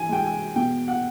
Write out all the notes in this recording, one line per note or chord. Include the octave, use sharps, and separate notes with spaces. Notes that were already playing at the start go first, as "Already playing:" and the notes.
Already playing: E3 G#5
G#3 G5
G#5
B2 G5
F#5